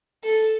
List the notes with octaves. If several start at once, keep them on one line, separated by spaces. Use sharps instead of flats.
A4